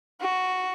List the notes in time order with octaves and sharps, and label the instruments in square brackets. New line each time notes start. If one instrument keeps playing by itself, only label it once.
[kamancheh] F#4